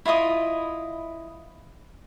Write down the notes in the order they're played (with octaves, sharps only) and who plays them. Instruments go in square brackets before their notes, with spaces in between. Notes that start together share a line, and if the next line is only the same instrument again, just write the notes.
[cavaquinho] E4 F4 D#5 D#6